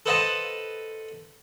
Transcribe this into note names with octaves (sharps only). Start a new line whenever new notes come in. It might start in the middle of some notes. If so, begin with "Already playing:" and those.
A4 B4 C5 D#5 F#5 A5